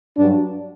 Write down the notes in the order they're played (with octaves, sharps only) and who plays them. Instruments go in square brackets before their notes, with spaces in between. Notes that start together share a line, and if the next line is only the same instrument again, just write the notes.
[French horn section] G2 F#3 D4